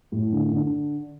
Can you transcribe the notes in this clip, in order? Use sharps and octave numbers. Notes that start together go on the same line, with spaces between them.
A2
D3
D3